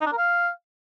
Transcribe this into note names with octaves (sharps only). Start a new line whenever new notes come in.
D#4
D4
A#4
F5